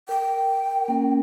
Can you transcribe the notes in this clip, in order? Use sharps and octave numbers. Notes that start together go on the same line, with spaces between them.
A#4 G5
A#3 C#4 A#4